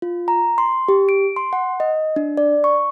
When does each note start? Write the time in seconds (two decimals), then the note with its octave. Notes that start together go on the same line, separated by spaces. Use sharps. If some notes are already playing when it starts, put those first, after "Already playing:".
0.02 F4
0.28 A#5
0.58 C6
0.88 G4
1.09 D7
1.36 C6
1.53 F#5
1.80 D#5
2.16 D4
2.37 D5
2.64 C#6